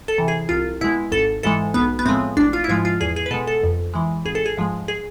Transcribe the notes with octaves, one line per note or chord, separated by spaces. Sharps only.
A4
C3 E3
G#4
C2 F4
B2 G#3 E4
G#1 A4
G#2 E3 G#3 A4
B1 B3
B3
A2 F3 G#3 C4
A1 D4
F4
E4
G#2 F3 G#3 F4
F4
E2 G#4
G#4
B4
B2 G#3 A4
A4
F2
E3 G#3
G#1 G#4
A4
G#4
G#2 F3 G#3
G#4